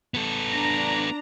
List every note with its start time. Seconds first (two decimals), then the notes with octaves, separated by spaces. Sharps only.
0.14 B3 A4
0.50 D4 A#5